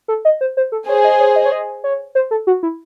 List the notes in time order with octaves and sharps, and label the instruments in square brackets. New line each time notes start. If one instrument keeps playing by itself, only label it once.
[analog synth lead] A4
D#5
C5
C5
A4
[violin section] G#4 C5 [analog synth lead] C#5
[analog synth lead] D#5
C#5
D#5
C#5
D#5
C#5
C5
A4
F#4
E4